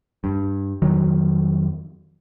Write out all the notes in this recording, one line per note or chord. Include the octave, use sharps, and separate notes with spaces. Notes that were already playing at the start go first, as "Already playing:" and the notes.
G2
F2 D#3 F#3